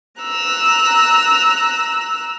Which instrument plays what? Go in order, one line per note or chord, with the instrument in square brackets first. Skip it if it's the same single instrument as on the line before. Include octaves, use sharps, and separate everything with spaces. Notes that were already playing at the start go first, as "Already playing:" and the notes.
[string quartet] A#5 E6 F#6